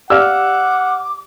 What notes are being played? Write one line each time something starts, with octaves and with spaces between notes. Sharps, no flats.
G4 D5 F5 F#5 D6 E6 F6